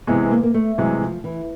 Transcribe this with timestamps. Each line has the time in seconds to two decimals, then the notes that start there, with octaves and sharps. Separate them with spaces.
0.07 C3 E3 G#3 B3
0.31 A#3
0.43 A#3
0.54 A3
0.78 C3 E3 F#3 G#3
1.01 F3
1.24 E3